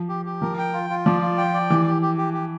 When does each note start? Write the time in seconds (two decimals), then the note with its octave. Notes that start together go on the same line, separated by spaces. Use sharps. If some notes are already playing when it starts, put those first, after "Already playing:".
Already playing: F3
0.09 G4
0.25 G4
0.42 F3 A#4
0.58 G5
0.73 F4
0.90 F4
1.06 F3 D5
1.22 F4
1.38 G5
1.54 D5
1.70 E3 G4
1.86 G4
2.02 G4
2.18 G4
2.34 G4